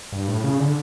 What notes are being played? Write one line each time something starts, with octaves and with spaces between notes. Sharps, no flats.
G2
A2
C#3
D3